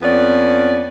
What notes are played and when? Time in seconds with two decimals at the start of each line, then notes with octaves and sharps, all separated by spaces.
0.02 F2 B3 C#4 D5